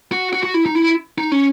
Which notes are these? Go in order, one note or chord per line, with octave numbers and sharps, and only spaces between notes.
F#4
F#4
F#4
E4
D#4
E4
D#4
C#4